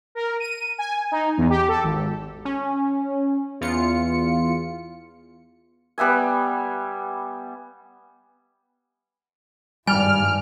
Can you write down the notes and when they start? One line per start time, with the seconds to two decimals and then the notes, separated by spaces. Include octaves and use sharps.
0.15 A#4
0.40 D#7
0.78 G#5
1.12 D#4
1.38 E2
1.50 G4
1.68 A4
1.84 G#1
2.45 C#4
3.61 E2 F4 C#7
5.98 G3 B3 E5 G#5
9.87 G#1 G2 G3 G#5 F6